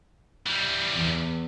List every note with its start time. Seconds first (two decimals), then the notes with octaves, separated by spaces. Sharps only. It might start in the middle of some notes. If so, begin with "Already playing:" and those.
0.47 E3 G3
0.92 E2